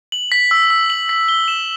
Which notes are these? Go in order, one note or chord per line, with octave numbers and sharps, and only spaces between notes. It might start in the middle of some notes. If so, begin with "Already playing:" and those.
F#7
B6
E6
E6
F#7
B6
G7
E7